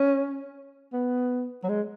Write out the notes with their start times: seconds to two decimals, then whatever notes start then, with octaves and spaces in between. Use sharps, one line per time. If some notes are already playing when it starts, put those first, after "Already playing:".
Already playing: C#4
0.93 B3
1.63 F#3
1.69 G#3